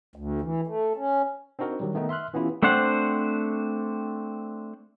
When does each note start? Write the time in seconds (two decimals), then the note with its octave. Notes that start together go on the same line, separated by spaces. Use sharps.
0.16 D2
0.42 E3
0.67 A3
0.96 C#4
1.59 C4 D4 D#4 F#4 A#4
1.80 D#3 F#3 G3
1.95 D#3 A3 B3 D#4
2.09 E5 C6 F6 F#6
2.34 E3 B3 C#4 E4 F4 G4
2.63 A3 C4 D4 C5 F#5